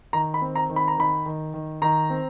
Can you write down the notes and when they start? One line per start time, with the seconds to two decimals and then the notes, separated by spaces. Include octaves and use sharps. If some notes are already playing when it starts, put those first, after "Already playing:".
0.13 D#3 A#5
0.34 B5
0.41 C4
0.56 A#5
0.70 D#3
0.76 B5
0.88 A#5
0.98 D#3 B5
1.26 D#3
1.54 D#3
1.82 D#3 A#5
2.10 C4